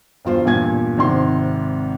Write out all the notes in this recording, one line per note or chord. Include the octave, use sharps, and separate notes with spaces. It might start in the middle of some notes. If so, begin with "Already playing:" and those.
E1 G2 F4 C5
E2 G2 A#2 G#5 G#6
G#1 G#2 C3 C6